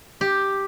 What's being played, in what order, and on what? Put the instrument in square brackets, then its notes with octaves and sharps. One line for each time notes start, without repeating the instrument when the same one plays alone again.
[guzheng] G4